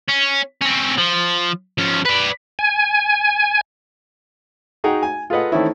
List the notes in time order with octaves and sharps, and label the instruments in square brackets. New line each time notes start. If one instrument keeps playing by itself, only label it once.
[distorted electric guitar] C#4
C4 C#4
F3
F3 C#4
B4 D5
[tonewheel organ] G#5
[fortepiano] D#4 F#4 G#4 F#5 G5 A#5
G#5
F4 G#4 A4 B4 D#5 F#5
D#3 E3 A3 C4 C#4 E4